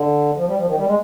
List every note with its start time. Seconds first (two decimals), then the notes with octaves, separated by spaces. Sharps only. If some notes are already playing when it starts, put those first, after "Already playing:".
Already playing: D3
0.36 F3
0.47 G3
0.57 F3
0.67 D#3
0.77 G3
0.87 G#3